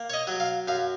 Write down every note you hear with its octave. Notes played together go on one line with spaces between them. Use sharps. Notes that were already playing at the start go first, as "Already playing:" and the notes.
Already playing: A#3
C#5
D#5
F#3
F5
F#2 F5